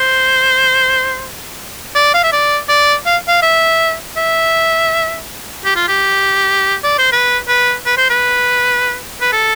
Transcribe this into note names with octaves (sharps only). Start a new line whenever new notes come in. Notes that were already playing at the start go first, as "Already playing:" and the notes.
Already playing: C5
D5
F5
E5
D5
D5
F5
F5
E5
E5
G4
F4
G4
D5
C5
B4
B4
B4
C5
B4
B4
A4